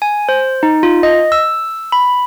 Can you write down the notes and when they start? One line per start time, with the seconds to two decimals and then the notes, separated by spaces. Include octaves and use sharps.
0.02 G#5
0.29 C5
0.63 D#4
0.83 F4
1.03 D#5
1.32 E6
1.92 B5